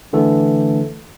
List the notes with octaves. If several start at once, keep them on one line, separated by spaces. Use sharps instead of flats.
D3 E3 A3 A4